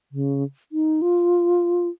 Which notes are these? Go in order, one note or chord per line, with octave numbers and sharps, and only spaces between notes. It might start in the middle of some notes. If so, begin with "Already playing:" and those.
C#3
D#4
F4